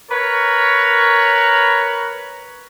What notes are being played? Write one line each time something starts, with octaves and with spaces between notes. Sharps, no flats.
A#4 B4 C#5